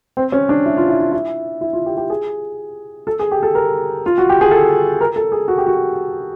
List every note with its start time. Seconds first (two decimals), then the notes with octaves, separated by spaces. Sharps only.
0.17 C4
0.32 C#4
0.49 D4
0.66 E4
0.77 F4
0.89 E4
1.01 F4
1.12 E4
1.61 E4
1.73 F4
1.86 G4
1.97 G4
2.10 G#4
3.07 A4
3.19 G#4
3.32 G4
3.43 A4
3.55 A#4
4.06 F4
4.18 F#4
4.29 G4
4.41 G#4
4.51 A4
5.01 A#4
5.16 A4
5.32 G#4
5.48 F#4
5.58 G4
5.67 F#4